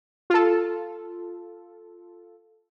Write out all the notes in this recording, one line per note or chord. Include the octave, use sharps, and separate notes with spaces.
F4 A4